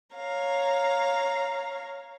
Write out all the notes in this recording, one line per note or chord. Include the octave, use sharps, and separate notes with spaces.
C#5 F5 A#5